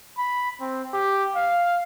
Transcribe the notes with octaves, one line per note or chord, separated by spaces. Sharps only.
B5
C4
G4
F5